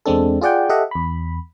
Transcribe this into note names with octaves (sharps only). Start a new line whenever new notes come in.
E2 G#3 C4 D4 A4
F4 G#4 D5 F#5 G5
G4 A4 D#5 E5 F#5
E2 B5